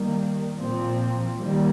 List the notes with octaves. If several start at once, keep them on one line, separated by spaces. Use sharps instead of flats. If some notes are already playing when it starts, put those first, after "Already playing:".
Already playing: D#3 G3 A#3
A#2 F3 C4
D#3 G3 A#3